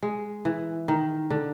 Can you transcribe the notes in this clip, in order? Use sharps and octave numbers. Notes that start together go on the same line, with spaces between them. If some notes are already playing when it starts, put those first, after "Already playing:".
G#3
E3
D#3
D3